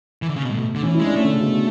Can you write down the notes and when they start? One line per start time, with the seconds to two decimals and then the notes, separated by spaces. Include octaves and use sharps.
0.22 E3
0.29 D3
0.36 C#3
0.43 B2
0.50 A2 A3
0.58 B2
0.75 D3
0.83 E3 C#4
0.94 E4
0.99 G#3
1.05 D4
1.16 A3 C#4
1.25 D3
1.33 C#3
1.41 B2